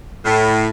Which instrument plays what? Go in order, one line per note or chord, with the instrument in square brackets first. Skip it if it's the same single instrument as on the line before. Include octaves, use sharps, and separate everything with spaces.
[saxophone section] A2